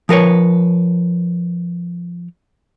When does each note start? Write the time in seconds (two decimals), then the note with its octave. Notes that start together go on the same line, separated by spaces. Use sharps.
0.09 F3 A#4 B4 C#5